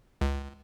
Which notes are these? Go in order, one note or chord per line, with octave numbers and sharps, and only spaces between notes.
C#2